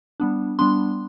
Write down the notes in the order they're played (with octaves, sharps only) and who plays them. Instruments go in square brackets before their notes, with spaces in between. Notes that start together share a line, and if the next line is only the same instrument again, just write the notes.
[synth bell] G3 B3 D4
G3 B3 D4 C6